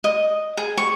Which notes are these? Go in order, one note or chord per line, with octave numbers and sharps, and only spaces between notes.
D#5
G#4
C#6